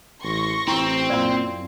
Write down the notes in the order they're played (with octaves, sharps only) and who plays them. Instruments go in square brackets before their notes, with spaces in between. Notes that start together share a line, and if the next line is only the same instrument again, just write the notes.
[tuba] A1 [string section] C6 C#6 A#6
[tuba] A1 [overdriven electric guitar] C4 [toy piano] E4
[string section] F#2 [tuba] A#2 [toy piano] D5 F5 C6